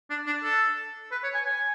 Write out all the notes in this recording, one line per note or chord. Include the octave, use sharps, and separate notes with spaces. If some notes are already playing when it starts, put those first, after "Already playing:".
D4
D4
A4
B4
C#5
G#5
G#5